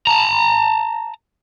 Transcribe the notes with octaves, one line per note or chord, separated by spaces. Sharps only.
A5 A#5